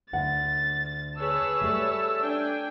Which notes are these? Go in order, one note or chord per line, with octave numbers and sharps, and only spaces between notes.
D2 F#5 A6
G#4 B4 C#5 A5 E6
G3 A3
D4 G5 G#5